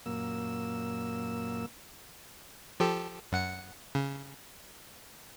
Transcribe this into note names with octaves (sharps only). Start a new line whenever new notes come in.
F#2 A#2 A#3 E6
F3 G4 A4
F#2 F#5 C#7
C#3